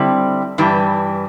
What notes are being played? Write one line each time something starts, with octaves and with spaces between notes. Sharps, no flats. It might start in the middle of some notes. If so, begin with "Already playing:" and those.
Already playing: D3 G3 C4 E4
G2 E3 G3